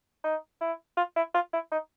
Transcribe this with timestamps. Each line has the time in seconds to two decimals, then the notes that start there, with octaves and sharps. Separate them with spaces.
0.24 D#4
0.61 E4
0.97 F4
1.16 E4
1.34 F4
1.53 E4
1.72 D#4